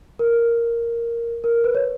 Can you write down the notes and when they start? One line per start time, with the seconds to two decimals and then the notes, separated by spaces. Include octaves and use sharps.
0.19 A#4
1.44 A#4
1.64 B4
1.75 C#5